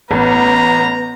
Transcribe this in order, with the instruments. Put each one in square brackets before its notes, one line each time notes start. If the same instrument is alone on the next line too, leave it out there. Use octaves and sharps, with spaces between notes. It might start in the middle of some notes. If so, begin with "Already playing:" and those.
[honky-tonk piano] A1 [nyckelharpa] B3 [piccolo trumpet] A#5